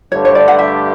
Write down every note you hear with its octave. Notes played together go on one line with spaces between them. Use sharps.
G2 D3 A3 D4 G4 C#5
C#5
D5
F#5
E5